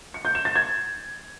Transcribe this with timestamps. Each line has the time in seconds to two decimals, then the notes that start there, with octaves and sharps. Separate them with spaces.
0.14 C#7
0.25 G6
0.35 E7
0.45 A6
0.55 G#6